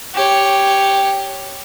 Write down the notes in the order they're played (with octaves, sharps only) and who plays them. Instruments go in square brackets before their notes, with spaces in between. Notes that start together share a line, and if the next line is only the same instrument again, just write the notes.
[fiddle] G4 C#5